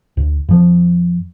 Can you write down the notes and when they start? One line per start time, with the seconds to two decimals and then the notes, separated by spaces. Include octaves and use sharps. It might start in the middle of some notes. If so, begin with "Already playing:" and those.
0.17 D2
0.49 F2 F3